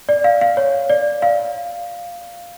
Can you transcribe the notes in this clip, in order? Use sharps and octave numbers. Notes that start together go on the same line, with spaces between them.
D5
F5
F5
C#5
D5
F5